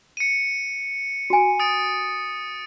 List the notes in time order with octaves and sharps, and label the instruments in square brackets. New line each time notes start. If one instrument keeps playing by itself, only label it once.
[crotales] C#7 D#7
[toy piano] F#4 G#5
[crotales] D#6 A6 D7